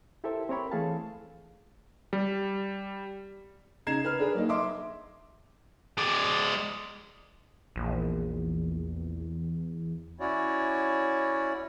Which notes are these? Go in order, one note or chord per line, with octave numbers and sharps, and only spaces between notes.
E4 G4 A4 A#4 C5 E5
C4 A#4 C#5 B5
E3 A3 G#4 A4 F5 A5
G3
C#3 D#4 A#5 G#6 C7 E7
B4 F6
D4 G#4 A#4 B4
F#3 A#3 D#4
D#5 E5 C6 D6
G#3 D5
A#1 E2
C#4 E4 F#4 C#5 D5